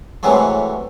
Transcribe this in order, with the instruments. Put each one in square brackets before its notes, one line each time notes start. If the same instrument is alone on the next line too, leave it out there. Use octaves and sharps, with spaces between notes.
[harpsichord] A2 C3 E3 F#3 G#3 A3